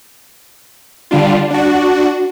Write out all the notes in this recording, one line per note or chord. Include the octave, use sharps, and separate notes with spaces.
D3 G3 D4 F4
D4 F#4